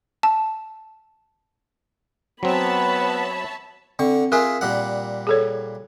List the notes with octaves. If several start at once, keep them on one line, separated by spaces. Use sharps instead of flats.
A5
F#3 B3 C4 C#5 E5 A5 B5
D3 C4 C#6
F4 G#4 A#4 E5 G#5
A#2 G3 F#5
G#4 A4 C#5